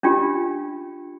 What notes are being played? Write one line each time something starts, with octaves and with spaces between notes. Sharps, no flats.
C#4 D4 F4 G4